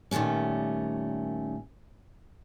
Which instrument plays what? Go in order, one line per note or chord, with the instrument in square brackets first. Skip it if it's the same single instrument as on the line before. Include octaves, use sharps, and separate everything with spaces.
[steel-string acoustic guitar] A#2 D#3 G3 A3 C#4